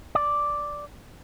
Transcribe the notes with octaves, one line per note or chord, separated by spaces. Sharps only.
D5